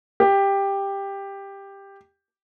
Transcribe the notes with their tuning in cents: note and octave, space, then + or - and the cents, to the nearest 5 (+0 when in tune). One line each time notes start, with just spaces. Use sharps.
G4 +10